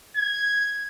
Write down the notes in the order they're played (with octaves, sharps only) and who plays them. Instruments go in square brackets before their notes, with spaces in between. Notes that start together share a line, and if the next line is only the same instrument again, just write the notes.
[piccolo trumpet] G#6